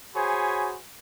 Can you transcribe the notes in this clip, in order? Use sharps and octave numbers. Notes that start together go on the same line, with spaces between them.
F#4 G#4 C5 C#5 G#5 B5